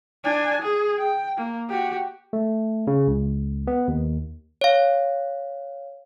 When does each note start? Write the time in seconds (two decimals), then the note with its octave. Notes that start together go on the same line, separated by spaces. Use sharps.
0.24 D4 G#5
0.62 G#4
0.98 G5
1.37 A#3
1.69 F#4 G4
2.33 A3
2.87 C#3
3.07 C#2
3.67 B3
3.88 D#2
4.61 C#5 F5